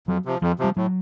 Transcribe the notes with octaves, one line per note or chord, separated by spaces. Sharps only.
F2 F#3
C3 F3
F2 F3
C3 F3 G3
A2 F#3